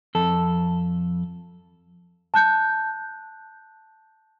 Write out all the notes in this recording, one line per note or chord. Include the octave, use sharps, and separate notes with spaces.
F2 A4
A5 F#6 G6